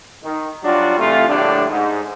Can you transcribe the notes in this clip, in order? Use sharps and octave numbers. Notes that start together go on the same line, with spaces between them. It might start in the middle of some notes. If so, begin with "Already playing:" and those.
D#3
F#3 G3 D4 F4 F#4
C3 E3 A3 F4
A#1 A2 D3 G3 D4
G#2